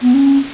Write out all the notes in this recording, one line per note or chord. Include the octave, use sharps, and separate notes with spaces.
B3
C#4